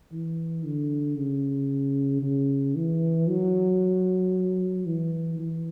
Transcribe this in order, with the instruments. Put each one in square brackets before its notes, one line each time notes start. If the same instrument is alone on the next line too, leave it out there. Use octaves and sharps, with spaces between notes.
[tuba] E3
D3
C#3
C#3
E3
F#3
E3
E3